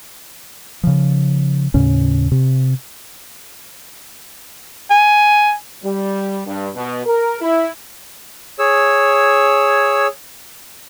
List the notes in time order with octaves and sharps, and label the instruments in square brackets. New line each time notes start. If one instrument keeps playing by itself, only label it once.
[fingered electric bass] C#3 F3
D#2 A2 C#3 C#4
C3
[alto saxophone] G#5
[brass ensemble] G3
G2
B2
A#4
E4
[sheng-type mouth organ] G#4 C#5 E6